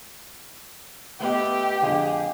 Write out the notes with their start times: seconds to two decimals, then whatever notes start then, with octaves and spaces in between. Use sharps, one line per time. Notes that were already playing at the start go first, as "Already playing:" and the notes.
1.20 A3 B3 G4 D#5
1.81 F2 D3 G#4